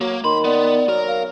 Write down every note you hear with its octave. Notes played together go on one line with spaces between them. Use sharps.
F#3 A#3
D#3 B5 C6
B3 D5
F#3 A#4
F5